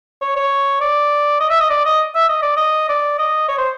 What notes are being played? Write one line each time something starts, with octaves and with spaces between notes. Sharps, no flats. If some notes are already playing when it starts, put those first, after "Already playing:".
C#5
C#5
D5
D#5
E5
D#5
D5
D#5
E5
D#5
D5
D#5
D5
D#5
C#5
C5